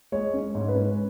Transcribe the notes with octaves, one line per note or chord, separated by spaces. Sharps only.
G#3 C#5
C#4
G#2
B4
C#4